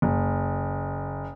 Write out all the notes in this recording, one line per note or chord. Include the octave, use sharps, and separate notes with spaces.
F#1